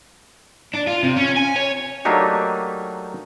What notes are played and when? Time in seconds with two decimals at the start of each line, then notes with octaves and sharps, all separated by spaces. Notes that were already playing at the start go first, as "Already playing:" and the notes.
0.75 D4
0.88 F4
1.04 C3
1.17 C#4
1.37 G#5
1.56 C#5
2.05 F#3 A3 A#3 D4 D#4 G4